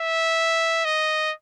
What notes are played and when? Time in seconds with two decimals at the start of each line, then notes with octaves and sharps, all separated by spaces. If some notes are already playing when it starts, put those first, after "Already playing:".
Already playing: E5
0.85 D#5